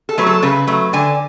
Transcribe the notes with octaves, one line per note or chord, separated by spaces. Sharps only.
A4
F#3 A3 B4
A4
C#3 B4
F#3 A3
D3 G#5